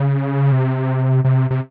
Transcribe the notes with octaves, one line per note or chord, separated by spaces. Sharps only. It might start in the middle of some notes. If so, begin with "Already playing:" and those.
Already playing: C#3
C3
C3
C3